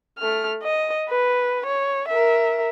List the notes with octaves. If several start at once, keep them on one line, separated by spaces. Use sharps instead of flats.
A3 F6
D#5
B4
C#5
A#4 E5